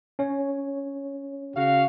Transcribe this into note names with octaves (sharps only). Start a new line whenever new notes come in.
C#4 C#5
C#3 F#4 F5